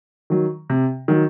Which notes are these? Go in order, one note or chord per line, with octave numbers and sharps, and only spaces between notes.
D#3 F#3
C3
D#3 F#3